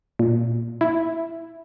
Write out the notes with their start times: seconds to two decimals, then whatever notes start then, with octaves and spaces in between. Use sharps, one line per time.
0.19 A#2
0.81 E4